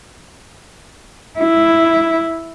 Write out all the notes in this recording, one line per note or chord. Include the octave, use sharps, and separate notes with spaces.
E4